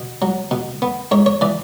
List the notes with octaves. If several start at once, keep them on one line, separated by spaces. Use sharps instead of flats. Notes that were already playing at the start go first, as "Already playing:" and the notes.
Already playing: B2
F#3
B2
B3
G#2 C#5
C#5
E3 D5